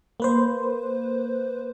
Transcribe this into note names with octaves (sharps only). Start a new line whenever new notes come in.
A#3 B4 C5